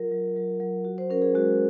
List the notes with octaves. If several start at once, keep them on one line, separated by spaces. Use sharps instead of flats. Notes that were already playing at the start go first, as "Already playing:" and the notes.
Already playing: F#3 F4 A#4
F#3
F#3
F#3
F#4
C5
C#4 A#4
G#4
G#3 F#4